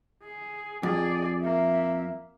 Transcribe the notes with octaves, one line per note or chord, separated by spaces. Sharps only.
G#4
F2 G#4 D5
A#3 E5